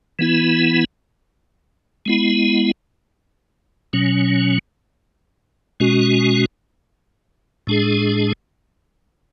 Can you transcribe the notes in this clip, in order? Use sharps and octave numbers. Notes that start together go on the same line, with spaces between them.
E3 B3 E4
G#3 B3 E4
B2 F#3 C#4
B2 G#3 C#4 F#4
A2 G#3 D4 G#4